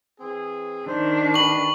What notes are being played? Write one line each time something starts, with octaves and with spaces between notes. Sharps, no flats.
E3 C4 G#4
D#3 D4 C5
E3 G4 B5 C#6 F#7